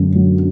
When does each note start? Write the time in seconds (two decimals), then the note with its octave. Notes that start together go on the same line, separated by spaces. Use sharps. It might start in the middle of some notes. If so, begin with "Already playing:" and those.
Already playing: F#2 D3
0.15 F#3